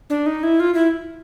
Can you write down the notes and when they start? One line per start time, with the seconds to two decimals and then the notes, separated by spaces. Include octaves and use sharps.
0.10 D4
0.26 D#4
0.43 E4
0.60 F4
0.74 E4